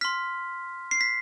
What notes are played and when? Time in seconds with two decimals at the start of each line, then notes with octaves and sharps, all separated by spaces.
0.01 C6 F6 B6
0.91 C7
1.01 B6